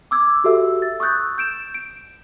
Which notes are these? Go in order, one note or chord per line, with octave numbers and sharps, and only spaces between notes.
D6 E6 G#6
F#4 G4 A4 E5 E6
A6
C#6 D#6 E6 F#6 G6 A6
G6 D7 E7
D7